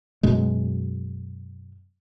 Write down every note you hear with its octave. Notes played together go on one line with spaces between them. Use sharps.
F#2 B2 G#3